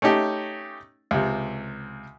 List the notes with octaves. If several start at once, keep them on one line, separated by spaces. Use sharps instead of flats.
A3 C#4 D#4 G4
C#2 C3